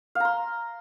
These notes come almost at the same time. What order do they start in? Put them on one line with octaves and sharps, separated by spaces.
F5 A#5 C6